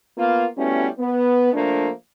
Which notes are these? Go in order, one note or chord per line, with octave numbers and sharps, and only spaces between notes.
A#3 B3 F4
G3 A3 B3 C#4 E4 F#4
B3
F3 A3 A#3 D4